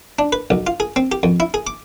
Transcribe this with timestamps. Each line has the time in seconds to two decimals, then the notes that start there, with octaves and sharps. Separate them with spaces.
0.19 D4
0.32 B4
0.50 B1
0.67 F4
0.80 G#4
0.96 C4
1.12 G4
1.23 F2
1.40 E4
1.54 G#4
1.67 D6